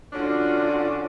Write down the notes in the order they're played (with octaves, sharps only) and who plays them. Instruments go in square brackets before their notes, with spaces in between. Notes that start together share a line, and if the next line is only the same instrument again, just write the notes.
[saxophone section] D3 C#4 D4 [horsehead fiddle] F4 F#4